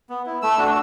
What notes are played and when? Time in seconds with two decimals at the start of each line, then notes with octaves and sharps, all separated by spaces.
0.10 B3
0.26 E4
0.42 A3 E6
0.58 D4 F#4